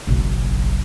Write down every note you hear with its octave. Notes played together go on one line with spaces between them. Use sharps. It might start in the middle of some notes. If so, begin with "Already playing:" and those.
F#1 B1